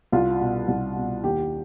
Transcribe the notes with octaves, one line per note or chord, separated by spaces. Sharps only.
C2 F4
B2
C2
B2
D#2 G4